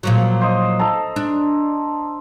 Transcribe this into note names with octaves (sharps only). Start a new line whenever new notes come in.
A#2 F3 F#3
C5 D#5
A4 A#5
D4